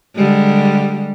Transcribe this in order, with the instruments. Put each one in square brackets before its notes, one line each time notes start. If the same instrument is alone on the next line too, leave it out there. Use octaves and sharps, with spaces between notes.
[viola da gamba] D3 G3 G#3